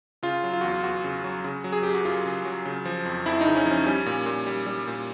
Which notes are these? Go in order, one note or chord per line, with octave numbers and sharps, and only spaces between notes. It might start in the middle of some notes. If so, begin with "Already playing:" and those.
C#3 F4
F#3
F4
E2 F#4
F4
E2 F#4
C#3
F#3
C#3
F#3
G#4
F#2 G4
F#4
F#2 F4
C#3
F#3
C#3
F3
F2
F2 E4
C#3 D#4
C#4
F3
C#4
G3 C#4
A#2
A#2
G3
G3
A#2